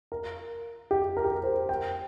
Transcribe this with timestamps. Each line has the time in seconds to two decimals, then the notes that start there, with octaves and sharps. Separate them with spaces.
0.12 A#4
0.91 G4
1.17 A#4
1.25 G4
1.32 A#4
1.43 C5
1.69 G5